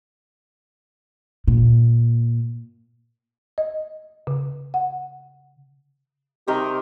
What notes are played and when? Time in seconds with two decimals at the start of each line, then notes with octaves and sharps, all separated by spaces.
1.48 A#2
3.58 D#5
4.27 C#3
4.74 F#5
6.48 C3 D#3 G4 A#4